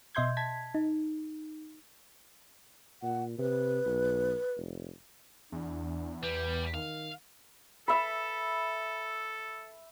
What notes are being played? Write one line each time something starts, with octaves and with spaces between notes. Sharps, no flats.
B2 D#5 E5 C6 G6 G#6
A5 G#6 B6
D#4
A#2 F#5
C3 B4
B1
F1
E2 D4
G3 B4
D#3 F5
A4 E5 B5